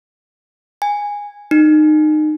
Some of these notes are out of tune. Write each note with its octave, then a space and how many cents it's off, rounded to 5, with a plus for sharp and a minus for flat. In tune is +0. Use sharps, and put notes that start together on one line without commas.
G#5 -15
D#4 -25